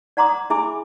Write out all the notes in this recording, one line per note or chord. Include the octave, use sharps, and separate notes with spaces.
D5 F#5 A#5 C6 D6 D#6
E4 G#4 E5 G#5 B5 D6